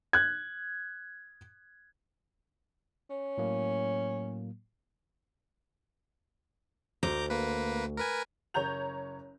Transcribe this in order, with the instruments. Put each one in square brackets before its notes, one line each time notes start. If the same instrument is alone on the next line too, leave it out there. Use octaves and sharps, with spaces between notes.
[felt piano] F#6 G#6
[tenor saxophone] C#4
[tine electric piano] A2 F#3 A#3
[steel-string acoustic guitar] D2 [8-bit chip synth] A#5 D6 G6
[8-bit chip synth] A#3 B4
A#4 B4 G#5
[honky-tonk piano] F#1 C#5 A#5 G6 F7